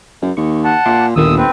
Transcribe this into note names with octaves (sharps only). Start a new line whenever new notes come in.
F#2
D#2 C#6
F#5 A5
A#2 E5 C6 D6
G1 D#2 A#2 A#3 D#6 E6
C4 B4